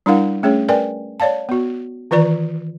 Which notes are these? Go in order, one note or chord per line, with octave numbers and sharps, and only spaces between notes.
G3 D4 E4 A#4 F5 F#5
A3 C#4 G#4 C#5
A#4 B4 D5 G5 G#5
C#5 D5 F5 A5
B3 F#4
D#3 E3 F4 B4 D5 A#5